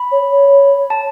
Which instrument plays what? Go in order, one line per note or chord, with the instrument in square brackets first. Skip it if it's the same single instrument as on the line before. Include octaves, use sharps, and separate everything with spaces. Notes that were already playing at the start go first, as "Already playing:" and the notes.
Already playing: [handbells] B5
[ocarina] C#5
C#5
[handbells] A5